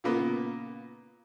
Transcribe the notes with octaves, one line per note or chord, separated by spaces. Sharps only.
A#2 C#3 A#3 B3